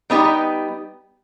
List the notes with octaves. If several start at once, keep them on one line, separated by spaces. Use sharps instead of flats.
G3 B3 D#4 G4